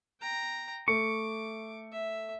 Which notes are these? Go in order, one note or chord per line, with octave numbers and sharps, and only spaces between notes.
G5 A#5
A3 C#6 D6
E5